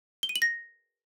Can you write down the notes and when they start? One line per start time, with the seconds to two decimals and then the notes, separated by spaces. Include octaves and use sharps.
0.23 G7
0.29 D#7
0.36 F#7
0.42 A#6